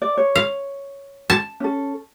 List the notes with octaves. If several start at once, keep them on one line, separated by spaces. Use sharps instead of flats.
D5
C#5
F5
A5
C#4 A4